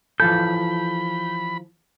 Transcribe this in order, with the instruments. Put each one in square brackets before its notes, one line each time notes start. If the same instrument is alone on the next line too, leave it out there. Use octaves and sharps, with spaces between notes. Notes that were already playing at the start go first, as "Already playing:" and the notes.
[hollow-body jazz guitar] E3 F3 A4 [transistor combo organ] B5 [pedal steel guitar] G6